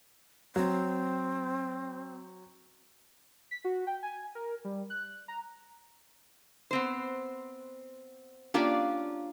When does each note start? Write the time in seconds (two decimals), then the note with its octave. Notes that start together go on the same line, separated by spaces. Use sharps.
0.56 F#3 C4
3.51 B6
3.64 F#4
3.87 G5
4.03 G#5
4.35 A#4
4.64 G3
4.90 F#6
5.28 A#5
6.71 B3 C4 C5
8.54 A#3 C#4 D4 F4 G4 D5